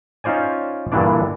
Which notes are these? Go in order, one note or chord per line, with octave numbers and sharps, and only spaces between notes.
C#4 D#4 F4 C5 D5 G#5
G2 A#2 D3 E3 D4 D5